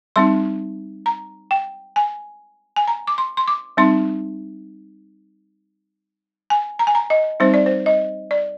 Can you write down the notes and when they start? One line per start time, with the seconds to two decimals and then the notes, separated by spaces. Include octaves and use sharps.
0.16 G3 C4 D#4 C6
1.06 A#5
1.51 G5
1.96 G#5
2.76 G#5
2.88 A#5
3.07 D6
3.18 C6
3.37 C6
3.48 D6
3.77 G3 C4 D#4 C6
6.50 G#5
6.79 A#5
6.87 G#5
6.95 A#5
7.10 D#5
7.40 G3 C4 D#4 C5
7.54 D5
7.66 C5
7.86 D#5
8.31 D5